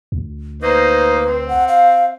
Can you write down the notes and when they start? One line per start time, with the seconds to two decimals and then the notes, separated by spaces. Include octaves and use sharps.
0.12 D2
0.62 A#3 D#4 B4 C5
1.26 C4
1.49 F#5
1.68 F5